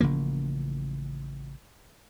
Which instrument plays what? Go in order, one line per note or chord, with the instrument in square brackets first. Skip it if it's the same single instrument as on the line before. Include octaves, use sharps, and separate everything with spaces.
[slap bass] A1 C#3 F3 A#3